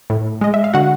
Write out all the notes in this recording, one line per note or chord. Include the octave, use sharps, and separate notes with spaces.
A2
G#3 D#5
E5
F5
D3 F#4 F#5